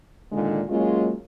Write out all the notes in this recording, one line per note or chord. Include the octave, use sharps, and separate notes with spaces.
A#2 D3 D#3 G#3
F#3 G#3 A#3 C#4 F4